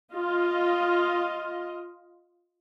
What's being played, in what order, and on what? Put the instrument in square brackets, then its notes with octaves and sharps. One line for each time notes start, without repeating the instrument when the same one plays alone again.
[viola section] F4 D#5